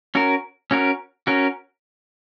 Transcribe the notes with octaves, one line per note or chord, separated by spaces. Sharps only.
C#4 F#4 A#4
C#4 F#4 A#4
C#4 F#4 A#4